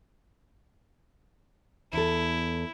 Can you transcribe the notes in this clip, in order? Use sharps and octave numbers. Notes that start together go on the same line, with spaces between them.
E2 E4 A4